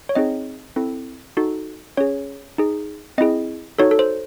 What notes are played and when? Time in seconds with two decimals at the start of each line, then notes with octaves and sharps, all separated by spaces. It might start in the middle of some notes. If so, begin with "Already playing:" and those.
0.09 C#5
0.15 C4 D#4 G#4 D#5
0.76 C4 E4 A4
1.37 D#4 F#4 A4
1.97 C#4 G#4 C#5
2.58 D#4 G#4
3.18 C4 E4 G#4 D#5
3.79 D#4 F#4 A4 C#5
3.91 A4
3.99 C5